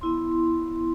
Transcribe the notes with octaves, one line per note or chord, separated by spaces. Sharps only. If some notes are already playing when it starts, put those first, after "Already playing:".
B3 E4 C6